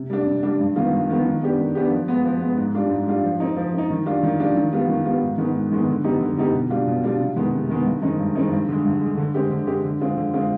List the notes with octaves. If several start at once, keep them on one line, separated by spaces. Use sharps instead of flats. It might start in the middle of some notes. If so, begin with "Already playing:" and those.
Already playing: C3
G3 D4
C3
G3 D4
G2
D#3 B3 F4
G2
D#3 B3 F4
D#3
B3 D4 G4
D#3
B3 D4 G4
F3
G#3 B3
F3
G#3 B3
G#2
G3 D4 F4
G#2
G3 D4 F4
F3
C4 D#4
F3
C4 D#4
D#3
G3 D4 F4
D#3
G3 D4 F4
D#3
G3 B3 F4
D#3
G3 B3 F4
G#2
D#3 G#3 B3
G#2
D#3 G#3 B3
D3
G3 B3 D#4 G4
D3
G3 B3 D#4 G4
B2
G3 D4 F4
B2
G3 D4 F4
C3
D#3 G#3 B3
C3
D#3 G#3 B3
G2
D#3 G#3 C4 D#4
G2
D#3 G#3 C4 D#4
G2
D3 G#3
G2
G#3
D3
D3
G#3 C4 G4
D3
G#3 C4 G4
D3
G#3 C4 F4
D3
G#3 C4 F4